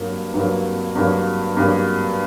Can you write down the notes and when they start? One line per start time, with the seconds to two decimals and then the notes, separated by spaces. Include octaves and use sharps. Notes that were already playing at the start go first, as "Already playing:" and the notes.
Already playing: G2 F#3 A#3
0.34 G2 F#3 A#3
0.96 G2 F#3 A#3
1.57 G2 F#3 A#3